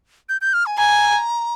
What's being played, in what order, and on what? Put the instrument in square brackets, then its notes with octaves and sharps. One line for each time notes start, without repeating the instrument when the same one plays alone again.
[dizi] G6
G6
F6
G#5
[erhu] G#5 [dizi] A#5